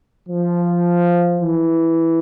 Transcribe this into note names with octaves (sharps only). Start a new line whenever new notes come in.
F3
E3